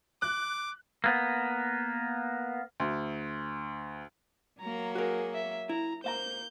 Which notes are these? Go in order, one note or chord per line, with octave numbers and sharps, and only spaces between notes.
D6 F#6
A#3 B3
D2
F#3 A#3 A#5
F#4 G#4 A#4
E5
E4 A#5
A#3 C5 F5 A#5 G6